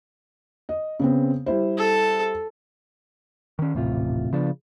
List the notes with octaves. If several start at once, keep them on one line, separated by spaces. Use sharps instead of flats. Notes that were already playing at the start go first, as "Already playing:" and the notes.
D#5
C#3 B3 C4
G3 E4 C5
A4
D#3 C#4
D#1 A1 A2 C3 F4
C#3 F3 B3 D4